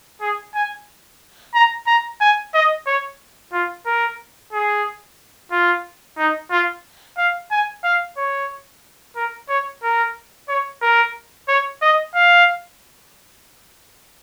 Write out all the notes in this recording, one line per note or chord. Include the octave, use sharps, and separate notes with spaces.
G#4
G#5
A#5
A#5
G#5
D#5
C#5
F4
A#4
G#4
F4
D#4
F4
F5
G#5
F5
C#5
A#4
C#5
A#4
C#5
A#4
C#5
D#5
F5